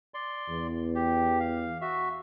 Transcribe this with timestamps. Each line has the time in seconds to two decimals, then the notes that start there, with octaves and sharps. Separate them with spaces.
0.14 D5 C6
0.48 E2
0.95 G4
1.40 F5
1.81 F#4 E5